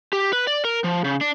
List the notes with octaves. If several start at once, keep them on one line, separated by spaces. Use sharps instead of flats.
G4
B4
D5
A#4
F3
C#3
D4